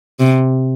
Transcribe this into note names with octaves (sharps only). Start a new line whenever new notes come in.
C3